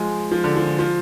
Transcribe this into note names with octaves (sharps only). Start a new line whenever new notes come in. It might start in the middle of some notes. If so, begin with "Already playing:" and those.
Already playing: F3 G#3
F3
D3
F3
F3